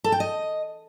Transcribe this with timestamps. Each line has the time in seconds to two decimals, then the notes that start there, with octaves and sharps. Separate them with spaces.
0.04 A4
0.12 G5
0.20 D#5